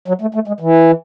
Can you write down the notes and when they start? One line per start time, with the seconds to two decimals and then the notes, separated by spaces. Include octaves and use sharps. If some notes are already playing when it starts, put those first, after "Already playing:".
0.08 F#3
0.21 A3
0.34 A3
0.48 G#3
0.60 E3